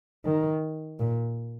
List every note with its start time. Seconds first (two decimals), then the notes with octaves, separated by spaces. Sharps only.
0.25 D#3
0.99 A#2